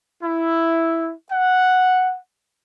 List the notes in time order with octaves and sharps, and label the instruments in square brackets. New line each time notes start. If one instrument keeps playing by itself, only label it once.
[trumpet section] E4
F#5